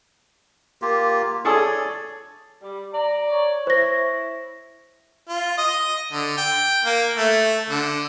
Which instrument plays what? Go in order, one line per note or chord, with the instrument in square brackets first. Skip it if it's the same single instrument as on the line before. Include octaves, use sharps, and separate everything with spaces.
[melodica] A#3 F4 G4
[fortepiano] G#4 A4 D#6 [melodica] C#5 D5
[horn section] G3
[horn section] D5 [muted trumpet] A#5
[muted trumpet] C#5
[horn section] E4 [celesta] C5 A#6
[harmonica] F4
D#5
D3
G5
A#3
A3
D3